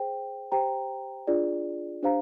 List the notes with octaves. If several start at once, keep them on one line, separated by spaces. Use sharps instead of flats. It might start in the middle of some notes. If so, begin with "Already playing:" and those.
Already playing: G#4 C5 G5
G4 C5 G5 A#5
D4 F4 G#4 D5
D4 G4 C5 F5 A#5